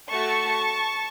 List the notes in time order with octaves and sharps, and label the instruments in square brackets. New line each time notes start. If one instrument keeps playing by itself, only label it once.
[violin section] A3 F#4 A4 A5 C#6